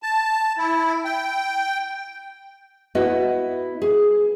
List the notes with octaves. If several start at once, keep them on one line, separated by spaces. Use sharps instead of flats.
A5
E4
G5
B3 E4 F#4 D#5 E5
G#4